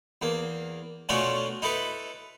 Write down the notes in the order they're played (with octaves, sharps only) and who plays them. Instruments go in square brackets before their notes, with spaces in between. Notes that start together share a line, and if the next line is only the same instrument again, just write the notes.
[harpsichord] E2 A#3
B2 A3 C#4 D4 F4 F#4
D#4 E4 A4 B4